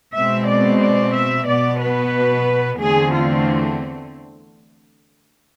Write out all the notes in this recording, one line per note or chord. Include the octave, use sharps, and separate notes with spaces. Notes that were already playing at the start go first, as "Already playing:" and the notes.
B2 G#3 C4 E5
D5
D5
E5
B2 B3 D5
B4
E2 D3 A3 C4 G#4
F4